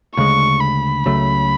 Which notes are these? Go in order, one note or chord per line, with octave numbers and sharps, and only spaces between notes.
D2 C#3 G#3 C#6
B5
C#2 C#3 F#3 A3